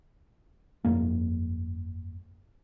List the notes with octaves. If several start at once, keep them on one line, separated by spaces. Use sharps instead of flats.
G1 F2 A#3